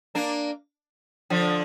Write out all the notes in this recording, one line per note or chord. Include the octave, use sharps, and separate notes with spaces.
A#3 D4
D3 F3